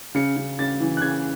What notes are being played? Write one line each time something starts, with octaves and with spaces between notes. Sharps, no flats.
C#3 C#7
C#3
C#3 A6
E3
F#6
C#3 G#6